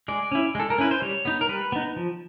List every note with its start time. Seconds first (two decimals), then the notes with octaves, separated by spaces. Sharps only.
0.08 G#3 D5
0.31 C#4 E4
0.55 G#3 A4
0.70 A#4
0.78 C#4 E4 B4
0.91 C5
1.02 G3 C#5
1.25 B3 D#4
1.41 A#4
1.49 G3 B4
1.72 B3 D#4
1.96 F3